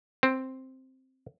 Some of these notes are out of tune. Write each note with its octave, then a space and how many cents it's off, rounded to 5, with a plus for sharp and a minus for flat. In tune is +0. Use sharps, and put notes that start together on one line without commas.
C4 +0